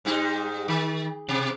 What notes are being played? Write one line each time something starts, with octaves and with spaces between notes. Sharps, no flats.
G#2 G3 D#4
D#3
B2